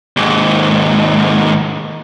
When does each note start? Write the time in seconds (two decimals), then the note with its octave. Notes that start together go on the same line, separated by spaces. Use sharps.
0.17 D#2 G#2